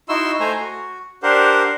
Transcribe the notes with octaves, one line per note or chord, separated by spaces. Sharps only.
D#4 E4 F#4 C6 E6
A3 C5 G#5 A#5
F#4
D4 G4 A#4 C5 F#5